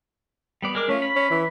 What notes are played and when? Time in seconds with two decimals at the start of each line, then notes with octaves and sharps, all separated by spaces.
0.62 G3 B3 D5
0.75 G#3 A#4 D6
0.89 A3 C#4 F4
1.02 B5
1.16 C#4
1.30 E3